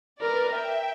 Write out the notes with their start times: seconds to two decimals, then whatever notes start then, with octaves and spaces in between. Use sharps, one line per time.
0.21 A#4 B4 D5
0.55 E5 G5